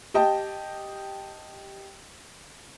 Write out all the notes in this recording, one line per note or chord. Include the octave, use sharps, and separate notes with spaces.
G4 D#5 G5 A5